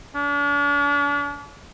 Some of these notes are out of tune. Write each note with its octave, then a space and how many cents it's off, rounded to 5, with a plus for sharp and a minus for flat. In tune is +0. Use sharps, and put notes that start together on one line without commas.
D4 -40